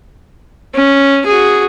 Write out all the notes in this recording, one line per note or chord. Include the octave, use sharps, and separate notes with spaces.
C#4
F#4 G#4